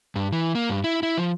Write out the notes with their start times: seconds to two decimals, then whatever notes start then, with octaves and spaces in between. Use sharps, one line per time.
0.16 G2
0.33 E3
0.55 A#3
0.70 G2
0.84 E4
1.03 E4
1.18 F3